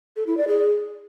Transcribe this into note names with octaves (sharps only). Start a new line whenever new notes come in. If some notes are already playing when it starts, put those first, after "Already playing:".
A4
E4
D5
G#4